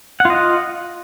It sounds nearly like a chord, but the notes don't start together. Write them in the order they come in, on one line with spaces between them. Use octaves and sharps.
F#5 F4 D#5